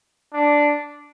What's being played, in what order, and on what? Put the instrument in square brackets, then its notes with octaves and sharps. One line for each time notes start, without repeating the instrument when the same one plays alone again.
[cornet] D4